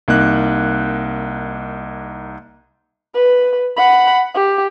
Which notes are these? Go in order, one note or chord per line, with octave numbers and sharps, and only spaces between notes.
C2 A#3 D#4 F#6
B4
F#5 B5
G4